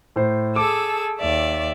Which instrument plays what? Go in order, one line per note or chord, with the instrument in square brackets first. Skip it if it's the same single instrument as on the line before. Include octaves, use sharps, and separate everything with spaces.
[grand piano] A2 C5
[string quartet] G#4 A4 E6 [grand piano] D6
[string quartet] D#2 D5 E5